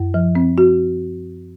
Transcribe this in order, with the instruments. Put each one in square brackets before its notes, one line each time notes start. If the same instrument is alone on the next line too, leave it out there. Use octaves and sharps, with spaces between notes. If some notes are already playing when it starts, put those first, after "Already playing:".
Already playing: [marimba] F#2
F3
C4
F#4